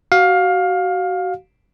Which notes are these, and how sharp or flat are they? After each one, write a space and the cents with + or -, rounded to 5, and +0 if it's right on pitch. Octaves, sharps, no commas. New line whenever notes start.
F#4 +25 F5 +20